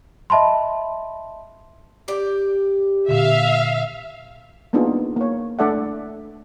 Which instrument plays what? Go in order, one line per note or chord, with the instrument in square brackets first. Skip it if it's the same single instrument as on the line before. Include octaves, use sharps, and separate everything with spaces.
[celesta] D#5 E5 A5 B5 C6
[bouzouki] G4 D5
[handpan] A#2 D3 [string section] E5 F5
[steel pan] A#3 B3 D4 D#4 F4 G#4
A#3 C#5
A3 D4 A4 D5 E5 F#5